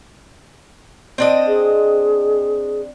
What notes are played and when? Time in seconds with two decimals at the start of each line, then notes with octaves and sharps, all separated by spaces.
1.18 C4 D4 D#5
1.47 G#4